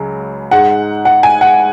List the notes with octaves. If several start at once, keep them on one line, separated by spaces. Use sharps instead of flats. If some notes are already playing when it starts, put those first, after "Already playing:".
Already playing: C#2 C#3 F#3
G#2 G#3 F#5
F#5
G#5
F#5